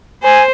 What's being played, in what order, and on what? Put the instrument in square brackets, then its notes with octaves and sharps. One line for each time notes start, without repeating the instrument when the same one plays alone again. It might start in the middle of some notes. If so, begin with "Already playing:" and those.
[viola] C5 [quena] G#5